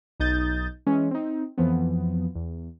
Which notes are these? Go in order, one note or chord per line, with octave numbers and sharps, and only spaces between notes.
B1 D#4 D#6 G6 A6
E3 G#3 C#4
C4 D#4
F2 E3 F3 B3
E2